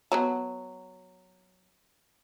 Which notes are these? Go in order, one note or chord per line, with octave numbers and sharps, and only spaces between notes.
F#3 B3 F#4 A5